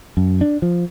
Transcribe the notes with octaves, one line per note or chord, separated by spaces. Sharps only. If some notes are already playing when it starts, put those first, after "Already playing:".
F#2
D4
F3